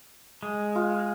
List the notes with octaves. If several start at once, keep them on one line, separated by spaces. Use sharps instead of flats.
G#3
F4